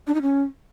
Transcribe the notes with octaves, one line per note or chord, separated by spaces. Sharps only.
D4
D#4
C#4